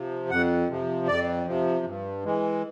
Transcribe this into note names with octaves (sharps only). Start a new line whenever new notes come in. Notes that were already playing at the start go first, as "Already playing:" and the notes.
Already playing: C3 F3
F2 F#5
C3 F3
F2 D5
C3 F3
G2
E3 G#3